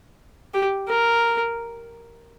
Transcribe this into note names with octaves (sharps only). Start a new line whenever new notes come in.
G4
A#4